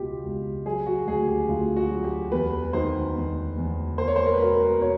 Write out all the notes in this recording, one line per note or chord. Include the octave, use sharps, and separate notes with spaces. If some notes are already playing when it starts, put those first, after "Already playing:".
Already playing: C#2 B2 F4 G4
C#2
F#3 G#4
F#4
D2 G#4
G4
D2 F4
F#4
F#3
G4
E2 B4
D#3 C5
E2
E2
A#3 C5
C#5
C5
A#4
B4
B2 A#4
A#4
B2 C#5